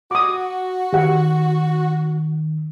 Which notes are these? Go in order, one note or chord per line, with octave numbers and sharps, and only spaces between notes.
F#4 D6 D#6
D#3 G4 F#5